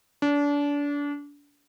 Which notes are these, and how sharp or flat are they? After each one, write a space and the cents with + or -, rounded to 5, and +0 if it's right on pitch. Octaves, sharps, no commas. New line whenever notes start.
D4 -30